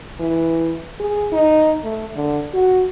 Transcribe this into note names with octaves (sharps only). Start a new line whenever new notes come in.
E3
G#4
D#4
A3
D3
F#4